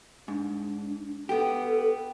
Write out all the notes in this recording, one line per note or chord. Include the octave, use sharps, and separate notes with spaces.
G#2 D4
B3 G4 A4